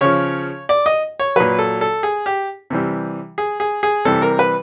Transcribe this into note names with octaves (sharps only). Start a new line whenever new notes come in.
C#3 F3 C#5
D5
D#5
C#5
A#2 F#3 B4
A4
A4
G#4
G4
C3 E3 G3
G#4
G#4
G#4
C3 E3 G3 A4
A#4
B4